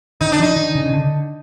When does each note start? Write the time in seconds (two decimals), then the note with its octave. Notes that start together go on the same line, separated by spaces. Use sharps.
0.21 D#3 D#4
0.32 D4
0.39 F3 D#4
0.56 D#3
0.75 C#3
0.86 C#3
0.93 D3